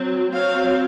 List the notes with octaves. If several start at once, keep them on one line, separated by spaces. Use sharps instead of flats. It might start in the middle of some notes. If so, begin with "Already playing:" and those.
Already playing: F#3 C4
F#3 C4 C#5 F5